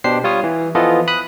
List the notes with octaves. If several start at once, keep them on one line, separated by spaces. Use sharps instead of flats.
B2 D4 G4 C5 C7
G3 F4 C#5 D#6
E3
E3 F3 B3 F4 A4 D#5
B5 D#6 F#6